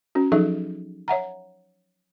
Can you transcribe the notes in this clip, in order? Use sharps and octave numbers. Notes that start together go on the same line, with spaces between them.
C#4 F#4
F3 F#3 D#4 G#4 A4 E5
C#5 E5 F#5 A#5